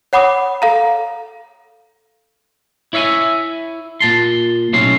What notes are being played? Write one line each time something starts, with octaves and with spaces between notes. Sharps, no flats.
C#5 F#5 B5 D6 D#6
A4 F5 A#5
E4 C#5 E5 F5 G#5
A#2 A5 C6
B1 A2 F#3 C#4 C6